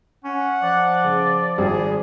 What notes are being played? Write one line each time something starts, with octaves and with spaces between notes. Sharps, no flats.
C#4 F#5
F3 D5
C#3
G#1 G3 G#4